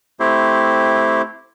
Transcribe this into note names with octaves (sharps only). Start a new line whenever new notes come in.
A3 C4 E4 G4 C5